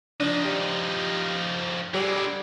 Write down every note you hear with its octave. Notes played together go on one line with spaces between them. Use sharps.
F3 D4 D#4
G4
D3 G3 G#3